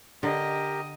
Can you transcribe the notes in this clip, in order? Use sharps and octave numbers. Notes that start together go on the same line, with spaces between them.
D3 G4 A#4 D#5